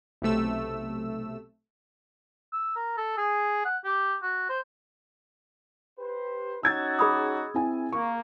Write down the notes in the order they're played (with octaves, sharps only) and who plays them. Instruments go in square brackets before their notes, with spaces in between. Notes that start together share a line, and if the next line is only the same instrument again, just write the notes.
[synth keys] B1 C3 A3 E6
[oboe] E6
A#4
A4
G#4
F#5
G4
F#4
C5
[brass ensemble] G4 B4 C5
[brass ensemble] C#4 D#4 F#4 [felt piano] E6 G#6 A6
[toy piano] G#4 B5 D#6
[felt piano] C4 E4 G#5
[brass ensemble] A#3 [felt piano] C#6